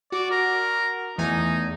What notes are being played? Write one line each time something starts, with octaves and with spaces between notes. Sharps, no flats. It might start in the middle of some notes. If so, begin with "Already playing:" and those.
F#4 D5
A#4
E2 A3 D#4 G#5